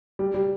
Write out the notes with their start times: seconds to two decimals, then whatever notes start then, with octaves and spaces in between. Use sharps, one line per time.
0.19 G3
0.34 G3